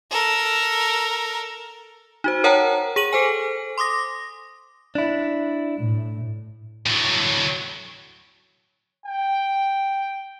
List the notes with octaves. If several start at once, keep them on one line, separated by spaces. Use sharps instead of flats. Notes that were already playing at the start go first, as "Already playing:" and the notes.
A4 A#4
D#4 F#4 C5
A#4 C#5 F#5 G5 A5 A#5
G#4 D#7 F#7
A4 C5 G#5
C6 D6 D#6 A#6
D4 E4
A2
A2 F#3
G5